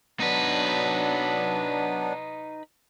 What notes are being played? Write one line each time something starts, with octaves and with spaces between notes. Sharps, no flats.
F#3 B3 D4 D#4 B4